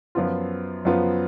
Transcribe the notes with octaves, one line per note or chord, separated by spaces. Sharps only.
F#2 F3 B3 F4
F#2 F3 B3 F4